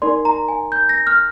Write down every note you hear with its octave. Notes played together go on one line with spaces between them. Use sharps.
D#4 A#4 D5 C6
A#5
G#5
G6
A#6
F6